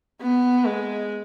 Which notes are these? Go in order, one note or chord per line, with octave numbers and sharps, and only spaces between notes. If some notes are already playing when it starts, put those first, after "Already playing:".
B3
G#3